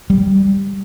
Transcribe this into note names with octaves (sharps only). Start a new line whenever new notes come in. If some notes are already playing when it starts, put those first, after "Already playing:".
G3